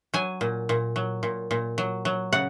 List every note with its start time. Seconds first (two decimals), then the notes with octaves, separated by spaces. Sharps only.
0.14 F#3 G#5
0.41 A#2
0.69 A#2
0.96 F#3
1.23 A#2
1.51 A#2
1.78 F#3
2.05 F#3
2.33 C#3 F#5